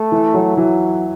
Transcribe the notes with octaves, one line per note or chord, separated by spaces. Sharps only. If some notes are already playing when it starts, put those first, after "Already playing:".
Already playing: A3
E3
F#3
E3 F#3